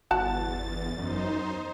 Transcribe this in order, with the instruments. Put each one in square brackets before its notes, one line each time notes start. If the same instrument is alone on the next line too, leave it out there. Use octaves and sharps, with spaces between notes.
[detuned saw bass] G1 [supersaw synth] E2 A6 [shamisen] F#4 F#5 A5
[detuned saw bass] F#2 [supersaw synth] D#4 C5